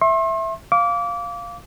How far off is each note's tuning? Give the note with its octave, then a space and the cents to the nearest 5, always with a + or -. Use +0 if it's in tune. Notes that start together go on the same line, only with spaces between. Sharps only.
E5 +0 C6 +40
F5 +0 D6 -25